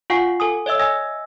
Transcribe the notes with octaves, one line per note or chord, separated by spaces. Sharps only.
F4 F5 F#5 G#5 C#6 C7
A4 G#5 D#6
C#5 D#5 E5 E6
D#5 G#5 D#6 E6 A#6